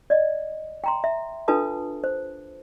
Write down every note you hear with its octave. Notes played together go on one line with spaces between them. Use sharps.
D5 D#5
G5 A#5 C6
E5
D4 F4 A4 B4 A5 D#6
C5